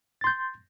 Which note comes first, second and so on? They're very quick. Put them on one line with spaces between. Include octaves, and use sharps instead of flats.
A6 C6 G6